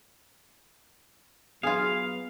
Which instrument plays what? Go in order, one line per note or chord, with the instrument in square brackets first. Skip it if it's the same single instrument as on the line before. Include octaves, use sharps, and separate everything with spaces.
[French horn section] F#3 B3 [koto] F4 G#4 [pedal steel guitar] F5